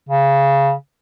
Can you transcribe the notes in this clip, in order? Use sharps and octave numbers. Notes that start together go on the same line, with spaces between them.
C#3